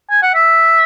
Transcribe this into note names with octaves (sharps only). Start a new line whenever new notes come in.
G#5
F#5
E5